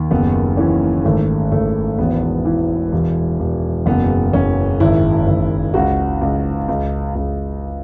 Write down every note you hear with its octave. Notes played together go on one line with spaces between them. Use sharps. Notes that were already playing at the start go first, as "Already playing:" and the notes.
Already playing: D#2
F#1 B3
E3 C#4
G#1 A3
G#1 A3
E1 B3
E3
E1
E1
F#1 B3
F#1 C#4
G#1 E4
G#1
C#2 F#4
C#2
C#2
C#2